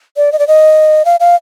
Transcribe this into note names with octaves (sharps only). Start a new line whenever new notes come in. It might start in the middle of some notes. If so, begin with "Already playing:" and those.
D5
D#5
D5
D#5
F5
F5